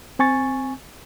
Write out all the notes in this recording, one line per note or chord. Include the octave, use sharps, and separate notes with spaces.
C4 G#5 C#6 A6